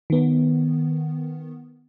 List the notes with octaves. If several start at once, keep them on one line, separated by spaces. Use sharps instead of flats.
D#3 B3